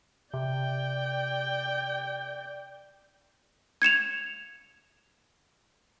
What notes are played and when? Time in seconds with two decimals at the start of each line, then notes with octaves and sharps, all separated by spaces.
0.34 C3 D5 G5
3.82 G#6 C#7 E7 F7